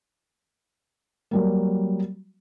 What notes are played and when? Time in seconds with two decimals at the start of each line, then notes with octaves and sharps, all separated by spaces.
1.31 F#3 G3 A#3